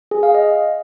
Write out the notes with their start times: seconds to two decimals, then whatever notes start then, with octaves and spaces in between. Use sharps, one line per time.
0.11 G#4
0.23 F5
0.35 D#5